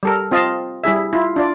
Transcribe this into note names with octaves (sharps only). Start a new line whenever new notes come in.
G3 A4 A#4
C4 F4 D#5 F5 A5
G3 E4 G#4 E5
E4 F4
D4 F4 D5